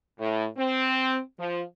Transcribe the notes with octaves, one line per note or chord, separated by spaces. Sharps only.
A2
C4
F3